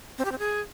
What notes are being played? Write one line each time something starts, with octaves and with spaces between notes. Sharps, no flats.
C4
G4
C4
G#4